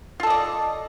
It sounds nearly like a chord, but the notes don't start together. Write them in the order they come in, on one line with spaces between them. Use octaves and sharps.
F4 A4 D#5 D5